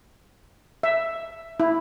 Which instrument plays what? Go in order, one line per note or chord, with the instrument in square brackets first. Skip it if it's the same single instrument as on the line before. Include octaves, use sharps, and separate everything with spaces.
[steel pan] E5
E4